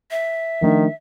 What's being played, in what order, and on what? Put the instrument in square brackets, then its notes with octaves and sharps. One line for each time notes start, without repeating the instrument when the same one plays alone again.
[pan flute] E5
[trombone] D#3 [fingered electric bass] F3 A3 D4